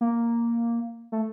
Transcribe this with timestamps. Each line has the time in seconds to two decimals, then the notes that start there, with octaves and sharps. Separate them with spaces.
0.01 A#3
1.12 A3